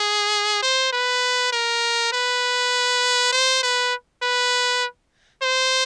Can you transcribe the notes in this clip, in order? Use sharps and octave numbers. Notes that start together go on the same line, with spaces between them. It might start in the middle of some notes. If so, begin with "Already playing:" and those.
Already playing: G#4
C5
B4
A#4
B4
C5
B4
B4
C5